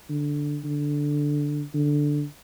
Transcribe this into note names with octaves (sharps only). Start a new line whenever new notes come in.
D3
D3
D3